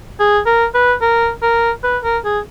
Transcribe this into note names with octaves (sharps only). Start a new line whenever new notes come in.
G#4
A#4
B4
A#4
A#4
B4
A#4
G#4